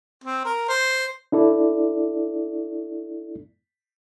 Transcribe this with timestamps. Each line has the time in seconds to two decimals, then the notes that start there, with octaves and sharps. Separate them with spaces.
0.24 C4
0.45 A#4
0.69 C5
1.32 D4 E4 A4 D5